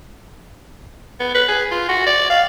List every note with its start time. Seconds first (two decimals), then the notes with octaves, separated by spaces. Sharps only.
1.20 B3
1.34 B4
1.48 G#4
1.71 F4
1.89 F#4
2.07 D5
2.30 F5